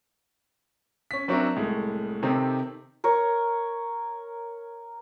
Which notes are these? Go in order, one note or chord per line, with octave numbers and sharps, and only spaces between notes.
C#4 B6
F#3 C4 D4 F#4 A#4 E5
C2 A2 G#3
C3 D#3 C4 D#4 G4 A4
A#4 C#5